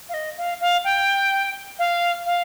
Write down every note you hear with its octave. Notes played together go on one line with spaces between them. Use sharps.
F5
D#5
F5
F5
G5
F5
F5